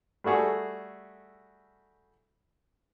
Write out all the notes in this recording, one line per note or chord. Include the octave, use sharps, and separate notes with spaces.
G3 A3 F#4 G#4 A4